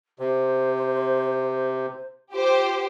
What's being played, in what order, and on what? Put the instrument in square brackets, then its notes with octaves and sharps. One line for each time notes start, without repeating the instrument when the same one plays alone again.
[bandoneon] C3 [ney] C5
[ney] F4 [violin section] G4 C5